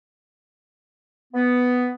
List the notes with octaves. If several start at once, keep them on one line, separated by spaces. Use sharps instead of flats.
B3